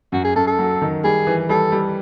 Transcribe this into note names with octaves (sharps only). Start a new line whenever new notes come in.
F#2 F#4
G#4
F#2 A4
A4
F#3
D#3
G3 G#4
E3
G3 A4
G3